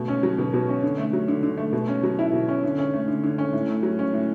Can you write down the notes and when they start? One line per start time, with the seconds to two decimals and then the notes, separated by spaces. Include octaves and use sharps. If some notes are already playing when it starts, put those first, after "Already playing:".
Already playing: B2 A3
0.08 C#4
0.23 F#3
0.38 B2
0.54 B2
0.69 C#4
0.83 D3
0.98 A3
1.13 F#3
1.28 D3
1.43 D3
1.57 A3
1.72 B2
1.88 C#4
2.03 F#3
2.19 E4
2.33 B2
2.48 C#4
2.64 D3
2.78 C#4
2.94 A3
3.08 D3
3.24 D3
3.38 C#4
3.53 A2
3.68 A3
3.83 F#3
3.99 C#4
4.14 A2